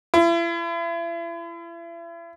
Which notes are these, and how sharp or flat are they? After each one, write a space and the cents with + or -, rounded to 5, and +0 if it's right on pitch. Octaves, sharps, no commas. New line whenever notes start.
E4 +40